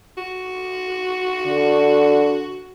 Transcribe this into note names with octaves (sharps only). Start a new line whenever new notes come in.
F#4
D3